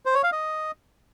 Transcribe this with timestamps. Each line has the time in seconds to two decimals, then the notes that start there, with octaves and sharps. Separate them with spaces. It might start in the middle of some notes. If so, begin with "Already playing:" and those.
0.06 C5
0.14 C#5
0.23 F5
0.32 D#5